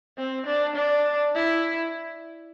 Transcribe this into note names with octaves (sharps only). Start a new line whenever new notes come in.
C4
D4
D4
E4